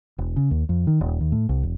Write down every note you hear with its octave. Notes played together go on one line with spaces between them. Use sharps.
E1
C#3
D#2
F2
D#3
D#1
D#2
A2
C2
E1